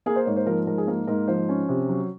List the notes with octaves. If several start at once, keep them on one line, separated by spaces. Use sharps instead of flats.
A#3 G#4
C5
G#2 C#5
C5
F3 A#4
G#2 A#4
G#4
A#3 A#4
G#2 A#4
F3 C5
C#4
C3
F#3